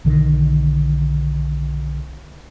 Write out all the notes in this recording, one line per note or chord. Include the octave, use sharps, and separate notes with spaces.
B1 D3 D#3